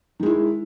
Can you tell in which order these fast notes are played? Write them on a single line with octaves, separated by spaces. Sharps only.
D#3 G#3 E4